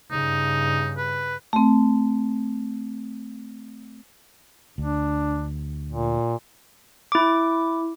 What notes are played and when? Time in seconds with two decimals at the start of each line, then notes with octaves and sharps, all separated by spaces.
0.11 G2 C#3 D#4
0.97 B4
1.53 A3 C4
4.78 D2 D4
5.90 A#2
7.12 E4 D6